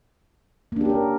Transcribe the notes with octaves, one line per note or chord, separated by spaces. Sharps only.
A#3 C#4 D4 G4 A#4